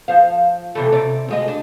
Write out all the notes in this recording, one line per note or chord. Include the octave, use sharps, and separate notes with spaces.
F3 C5 F5
C3 E3 A3
C3 D5
D2 G#3 D#5
D4